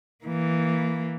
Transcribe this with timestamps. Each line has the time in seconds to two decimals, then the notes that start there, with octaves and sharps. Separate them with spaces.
0.24 E3 A#3